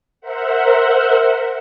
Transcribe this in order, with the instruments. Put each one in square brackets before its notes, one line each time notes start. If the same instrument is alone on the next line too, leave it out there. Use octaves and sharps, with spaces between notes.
[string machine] A#4 C5 E5 F#5